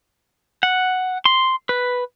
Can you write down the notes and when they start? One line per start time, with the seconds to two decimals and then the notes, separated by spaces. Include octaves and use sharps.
0.63 F#5
1.26 C6
1.69 B4